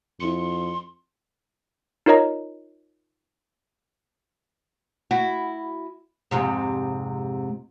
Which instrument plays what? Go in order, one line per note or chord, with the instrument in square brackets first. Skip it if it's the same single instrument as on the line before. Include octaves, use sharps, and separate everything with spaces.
[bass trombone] F2 [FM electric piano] E4 C#7 [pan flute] C6
[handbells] D#4 F4 A#4 C#5 D#5 A#5
[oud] E4 F#4
F2 G#2 C3